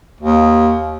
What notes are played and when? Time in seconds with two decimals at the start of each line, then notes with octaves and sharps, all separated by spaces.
0.20 D#2